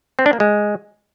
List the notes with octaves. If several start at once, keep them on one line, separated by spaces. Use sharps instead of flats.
C4
D4
A#3
G#3